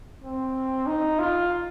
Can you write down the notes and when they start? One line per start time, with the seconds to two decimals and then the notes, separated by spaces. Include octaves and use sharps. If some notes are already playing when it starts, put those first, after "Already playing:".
0.22 C4
0.87 D#4
1.19 F4